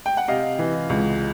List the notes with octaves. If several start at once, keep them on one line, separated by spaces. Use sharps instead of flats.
G5
F#5
C3 D#5 F5
E3
C#2